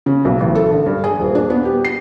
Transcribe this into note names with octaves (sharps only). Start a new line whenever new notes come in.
C#3
B1
A1
A4
D3
G2
G#4
D#1
D4
B3
G4
C7